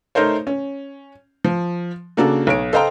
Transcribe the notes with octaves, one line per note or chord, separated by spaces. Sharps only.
A3 D#4 A#4 C5 C#5
C#4
F3
C#3 A#3 D4 F#4 A4
B1 C#5 D7
A4 C5 D#5 F5 G5 A#5